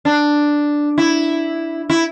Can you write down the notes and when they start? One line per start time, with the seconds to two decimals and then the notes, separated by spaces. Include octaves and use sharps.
0.05 D4
0.98 E4
1.89 E4